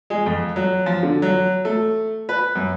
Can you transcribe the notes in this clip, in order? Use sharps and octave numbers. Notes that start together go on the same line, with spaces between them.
G#3
F2
F#3
F3
D3
F#3
A3
B4
F#2